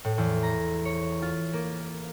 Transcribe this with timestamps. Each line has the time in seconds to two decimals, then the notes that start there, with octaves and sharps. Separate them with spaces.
0.05 A2
0.18 E2
0.43 A#5
0.85 C#5
1.22 F4
1.53 A#3